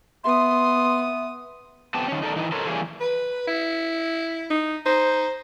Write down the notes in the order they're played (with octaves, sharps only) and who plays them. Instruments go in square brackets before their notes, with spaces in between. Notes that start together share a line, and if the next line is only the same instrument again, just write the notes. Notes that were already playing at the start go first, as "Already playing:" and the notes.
[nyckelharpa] B3 D#6 [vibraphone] E5 [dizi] C6
[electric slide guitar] B3 C4 G4 A5
D#3 C#4
D#4 A4 A#4 C5 D5
E3 D#4
A4 A#4 C5 C#5
E3 G3 A#3 C#4 G#4
[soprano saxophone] B4
E4
[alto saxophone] D#4
[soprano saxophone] D#4 [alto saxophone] C5